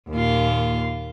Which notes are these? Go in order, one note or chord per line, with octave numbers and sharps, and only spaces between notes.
D#2 A#2 F4